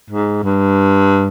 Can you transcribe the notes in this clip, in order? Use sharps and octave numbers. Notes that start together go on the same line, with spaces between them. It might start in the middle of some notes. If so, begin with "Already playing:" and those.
G#2
G2